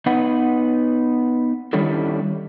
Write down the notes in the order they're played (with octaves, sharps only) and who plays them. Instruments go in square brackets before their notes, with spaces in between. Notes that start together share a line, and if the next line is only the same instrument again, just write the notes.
[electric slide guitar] B3 D#4 B4 F#5
D#3 G3 C#4 D4 E4 A4